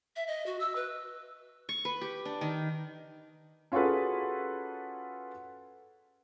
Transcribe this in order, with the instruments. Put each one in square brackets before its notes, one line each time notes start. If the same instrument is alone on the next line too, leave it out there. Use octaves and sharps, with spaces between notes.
[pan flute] E5
D#5
F#4
E6
B4
[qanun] C#6
B4
G4
D4
D#3
[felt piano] C#4 F4 F#4 G#4 A4 B4